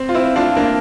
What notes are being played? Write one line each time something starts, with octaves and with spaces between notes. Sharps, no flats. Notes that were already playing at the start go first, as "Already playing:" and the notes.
Already playing: C4
F4
C4 E4
D4 F4
A#3 D4